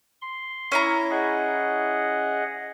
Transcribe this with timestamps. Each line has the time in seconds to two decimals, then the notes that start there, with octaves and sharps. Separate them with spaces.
0.22 C6
0.72 C#4 E4 A#5
1.10 G#4 D#5 F#5